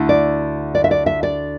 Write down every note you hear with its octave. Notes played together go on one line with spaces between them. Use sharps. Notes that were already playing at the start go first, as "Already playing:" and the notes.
Already playing: D2 D3 A3 E4
D5
D5
E5
D5
E5
D5